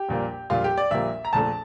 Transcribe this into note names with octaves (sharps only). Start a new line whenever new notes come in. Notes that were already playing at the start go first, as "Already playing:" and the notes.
Already playing: G4
A#1 A#2 G3 A#3
A#1 A#2 G3 A#3 F4
G4
D5
A#1 A#2 G3 A#3 E5
A#5
A#1 A#2 A3 A5